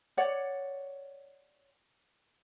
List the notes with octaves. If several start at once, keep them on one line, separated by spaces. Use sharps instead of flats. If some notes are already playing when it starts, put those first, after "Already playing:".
C#5 D5 F#5